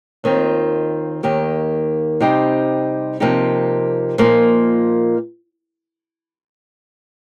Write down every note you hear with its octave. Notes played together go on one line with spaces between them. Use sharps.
D#2 D#3 C4 F4
D#2 D#3 A#3 G4
C3 G3 C4 D#4 G4
C3 F3 A#3 D#4 G4
A#2 F3 A#3 D#4